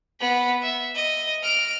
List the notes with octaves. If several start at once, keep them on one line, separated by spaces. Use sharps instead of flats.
B3 B6
E5
D#5
F6 D7